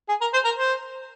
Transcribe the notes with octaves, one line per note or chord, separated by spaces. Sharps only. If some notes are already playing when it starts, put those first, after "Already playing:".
G#4
A#4
C5
A#4
C5